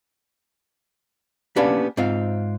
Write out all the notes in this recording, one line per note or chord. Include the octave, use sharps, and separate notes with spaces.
A#3 B3 C#4 D4 G4 B4
G#2 C4 F4 F5